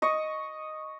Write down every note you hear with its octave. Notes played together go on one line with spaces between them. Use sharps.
D#5 C#6